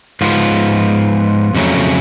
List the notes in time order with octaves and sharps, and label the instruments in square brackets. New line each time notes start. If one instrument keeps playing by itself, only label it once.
[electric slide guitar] G#2 F3 B3 F4
F2 C#3 F#3 A3 C#4